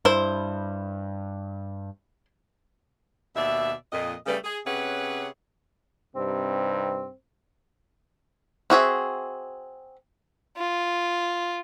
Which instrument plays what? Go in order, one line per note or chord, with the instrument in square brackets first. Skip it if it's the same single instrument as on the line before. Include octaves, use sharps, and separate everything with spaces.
[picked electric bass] G2 [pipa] E4 C5
[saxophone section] D#2 B2 D5 E5
F2 A#2 D#5
C#3 G3 A3 A4 B4 D5
G#4
C3 C#4 G#4 B4 C#5 F#5
[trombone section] G2 C3 D#4 [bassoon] C4
[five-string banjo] C4 F#4 G#4 E5
[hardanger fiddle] F4